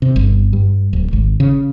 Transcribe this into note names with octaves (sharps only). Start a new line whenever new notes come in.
C3
G1
G2
D1
G#1
C#3